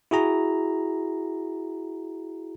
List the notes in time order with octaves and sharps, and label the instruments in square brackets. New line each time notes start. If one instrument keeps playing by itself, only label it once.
[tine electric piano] E4 F#4 G#4 A#5